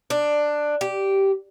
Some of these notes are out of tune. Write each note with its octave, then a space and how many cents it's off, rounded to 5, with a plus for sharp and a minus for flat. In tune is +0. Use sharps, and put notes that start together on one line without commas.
D4 +10
G4 -10